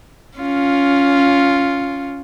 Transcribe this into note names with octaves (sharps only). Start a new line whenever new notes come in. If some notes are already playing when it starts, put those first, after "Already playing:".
C#4 F4